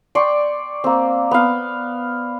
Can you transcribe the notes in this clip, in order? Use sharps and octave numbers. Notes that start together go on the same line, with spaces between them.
D5 G5 C6 C#6
A#3 C4
B3 F5